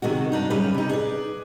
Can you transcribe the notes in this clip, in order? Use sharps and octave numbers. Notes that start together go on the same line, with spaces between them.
C3 D#3 G#3 F#4
G2 D4 D#4
F#2 C#3 G3 C#4 B4
C3 D#4
G#4 B4 D5